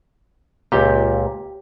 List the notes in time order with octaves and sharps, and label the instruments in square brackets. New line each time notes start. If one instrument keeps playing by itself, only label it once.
[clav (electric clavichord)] C#2 A#2 [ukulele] G4